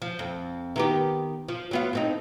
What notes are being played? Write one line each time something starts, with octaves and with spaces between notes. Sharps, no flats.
F3
F2
D#3 B3 G4
F3
F#3 B3 F4
A2 C4 D#4